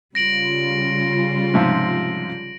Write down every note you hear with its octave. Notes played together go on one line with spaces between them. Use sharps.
C#3 G3 F4 A#6 D7 F#7
G#2 C3 F3